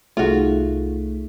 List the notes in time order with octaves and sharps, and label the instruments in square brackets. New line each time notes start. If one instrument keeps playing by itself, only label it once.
[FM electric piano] C2 A3 [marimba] D#4 G#4 A4 [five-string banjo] F4 F#4